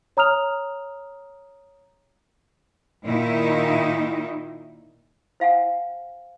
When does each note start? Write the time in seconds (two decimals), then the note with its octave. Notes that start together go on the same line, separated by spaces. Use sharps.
0.17 C#5 A#5 D#6 F6 F7
3.05 A#2 D#3 D#4 E4
5.40 C5 F5 F#5 G#5